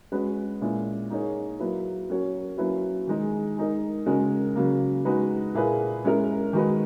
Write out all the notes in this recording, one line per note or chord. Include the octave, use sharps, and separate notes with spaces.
G#3 C#4 F#4 B4
A#2 G#3 C#4 E4
A#3 D#4 G#4 C#5
F#3 A#3 E4 B4
F#3 C#4 F#4 A#4 C#5
F#3 A#3 C#4 E4 B4
D#3 G#3 D#4 G#4
G#3 D#4 A#4
C#3 G#3 C#4 F#4 A#4
C#3 F#3 A#3
G#3 D#4 F#4 B4
A#2 A#3 E4 G#4 B4
G#3 C#4 E4 A#4
D#3 G#3 D#4 F#4 B4